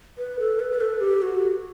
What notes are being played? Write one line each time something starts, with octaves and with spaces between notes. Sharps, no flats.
B4
A4
B4
B4
A4
G4
F#4